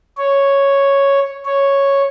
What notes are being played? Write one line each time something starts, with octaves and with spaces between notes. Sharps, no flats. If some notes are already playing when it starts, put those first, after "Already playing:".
C#5
C#5